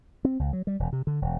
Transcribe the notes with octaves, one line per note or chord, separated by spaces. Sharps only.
C4
C#2
F#3
G3
E1
C3
D3
E1